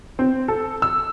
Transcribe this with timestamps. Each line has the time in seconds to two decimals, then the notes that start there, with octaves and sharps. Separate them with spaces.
0.19 C4
0.48 A4
0.82 E6